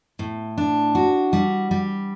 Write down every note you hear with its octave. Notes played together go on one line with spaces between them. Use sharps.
A2
D4
F#4
G3
G3